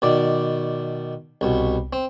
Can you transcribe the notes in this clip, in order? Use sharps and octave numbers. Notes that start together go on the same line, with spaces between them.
B2 D#3 D5
C2 B2
C4